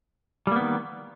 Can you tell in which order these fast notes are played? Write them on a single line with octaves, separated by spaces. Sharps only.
G3 A#3 B3 D#3